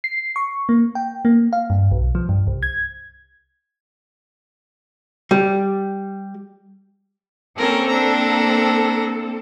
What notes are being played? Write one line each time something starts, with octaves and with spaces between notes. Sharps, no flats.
C7
C#6
A#3
G5
A#3
F5
G2
B1
F3
G2
C2
G#6
G3
A#3 C4 C#4 A4 A#4
D4 A#5